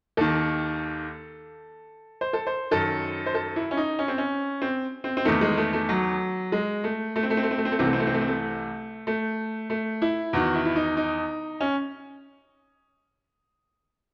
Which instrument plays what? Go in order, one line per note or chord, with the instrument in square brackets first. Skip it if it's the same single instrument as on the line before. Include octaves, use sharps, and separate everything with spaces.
[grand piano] D#2 D#3 A4
C5
A4
C5
F#2 D#3 A4
C5
A4
E4
C#4
D#4
C#4
C4
C#4
C4
C4
C4
E2 D#3 A3
G#3
A3
A3
F#3
G#3
A3
A3
C4
A3
C4
A3
C4
A3
C4
A3
C2 C3 E3 C4
A3
C4
A3
C4
A3
C4
A3
A3
A3
E4
E2 D#3 F#4
E4
E4
D#4
D#4
C#4